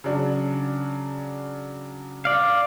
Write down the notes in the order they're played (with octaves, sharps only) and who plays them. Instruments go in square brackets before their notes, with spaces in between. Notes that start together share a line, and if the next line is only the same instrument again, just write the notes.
[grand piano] C#3 F#3 D4
[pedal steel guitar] D5 F5